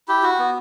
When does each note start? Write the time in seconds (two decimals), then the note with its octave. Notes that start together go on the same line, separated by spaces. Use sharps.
0.08 E4 G4
0.23 F#4
0.39 B3